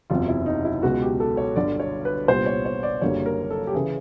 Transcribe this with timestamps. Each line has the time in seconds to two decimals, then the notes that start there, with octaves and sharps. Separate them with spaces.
0.10 F#1 E2 C3 F4
0.28 E4
0.46 D#4
0.65 E4
0.82 C#2 B2 G#3 B3 F#4
1.02 G4
1.20 A4
1.37 C#5
1.56 G1 G2 D3 F#3 D5
1.80 C#5
2.05 B4
2.28 C2 A#2 G3 B3 C5
2.46 C#5
2.65 C#5
2.83 D5
3.01 F#1 F#2 D3 G3 A#3 C#5
3.26 A#4
3.51 A4
3.67 G4
3.74 C#3 E3 G#4